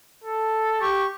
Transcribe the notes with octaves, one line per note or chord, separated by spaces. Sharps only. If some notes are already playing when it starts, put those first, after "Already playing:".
A4
G4 C#6